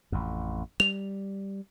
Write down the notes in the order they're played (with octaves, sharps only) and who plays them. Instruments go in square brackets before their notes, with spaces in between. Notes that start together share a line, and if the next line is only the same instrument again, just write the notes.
[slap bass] A1 F2
[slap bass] G3 [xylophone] F7